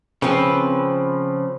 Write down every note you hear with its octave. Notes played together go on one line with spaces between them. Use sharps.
C#3 F3 C4 B4